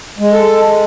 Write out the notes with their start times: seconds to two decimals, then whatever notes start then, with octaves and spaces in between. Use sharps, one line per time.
0.19 G#3
0.32 A4
0.46 G#3